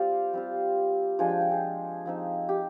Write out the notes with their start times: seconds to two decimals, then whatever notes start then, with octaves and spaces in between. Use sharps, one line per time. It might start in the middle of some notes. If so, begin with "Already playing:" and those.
Already playing: G3 C4 F4 C5 D5 F5
0.34 G3 C4 F4
1.19 F3 G#3 D4 G#5
1.30 G5
1.41 G5
1.52 G#4
2.06 F3 C4 D#4
2.49 G4